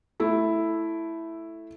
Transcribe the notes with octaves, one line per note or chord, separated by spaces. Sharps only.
A3 E4